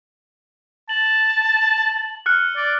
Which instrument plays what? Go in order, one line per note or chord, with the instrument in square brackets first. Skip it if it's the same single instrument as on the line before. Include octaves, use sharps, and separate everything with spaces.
[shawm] A5 [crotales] F#7
[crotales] F6 F#6 C#7
[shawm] D5